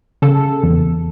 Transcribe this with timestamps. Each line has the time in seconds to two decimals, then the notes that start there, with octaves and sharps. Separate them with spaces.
0.22 C#3 A4
0.63 E2